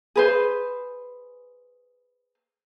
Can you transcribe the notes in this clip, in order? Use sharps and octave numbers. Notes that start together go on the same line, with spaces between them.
G#4 B4 C5